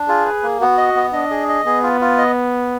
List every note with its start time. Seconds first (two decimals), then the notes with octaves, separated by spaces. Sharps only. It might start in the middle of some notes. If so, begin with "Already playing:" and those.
Already playing: D4
0.08 F4 G#4
0.26 B4
0.43 A#3
0.60 B3 F#4
0.78 D#5
0.96 B3
1.13 D4 D#5
1.31 G#4
1.49 D#5
1.66 B3 G#4
1.83 F4
2.01 F4
2.18 D#5